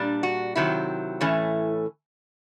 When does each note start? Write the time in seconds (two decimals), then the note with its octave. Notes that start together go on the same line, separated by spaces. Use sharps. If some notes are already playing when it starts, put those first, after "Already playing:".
Already playing: A#2 G3 D4
0.23 F#4
0.56 C3 D#3 F#3 E4
1.21 A2 E3 A3 C#4